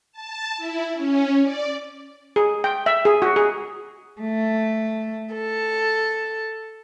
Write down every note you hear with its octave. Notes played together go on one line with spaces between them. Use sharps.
A5
E4
C#4
D5
G#4
G5
E5
G#4
F#4
G#4
A3
A4